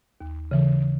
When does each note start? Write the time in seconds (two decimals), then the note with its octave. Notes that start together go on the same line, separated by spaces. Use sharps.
0.21 D#2
0.51 C#3 E3